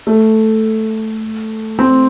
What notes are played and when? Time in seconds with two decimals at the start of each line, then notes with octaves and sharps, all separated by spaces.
0.07 A3
1.79 C4